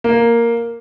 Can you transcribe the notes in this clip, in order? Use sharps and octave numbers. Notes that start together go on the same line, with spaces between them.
A#3